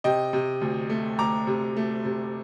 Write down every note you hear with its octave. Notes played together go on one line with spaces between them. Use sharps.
C3 D#5 G5
C3
D2
A3
D2 A#5 D6
C3
A3
C3